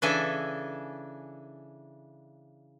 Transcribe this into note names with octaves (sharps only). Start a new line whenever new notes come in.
C#3 E3 D4 A4 E5 G#5